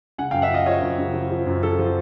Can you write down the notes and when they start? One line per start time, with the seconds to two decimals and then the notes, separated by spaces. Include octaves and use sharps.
0.18 C#3 F#5 G#5
0.31 F5 G5
0.34 F#2
0.42 E5 F#5
0.51 F3 D#5 F5
0.66 F3 C#5 D#5
0.82 F#2
0.99 C#3
1.14 F3
1.30 F3
1.47 F#2
1.63 F3 A4
1.79 F3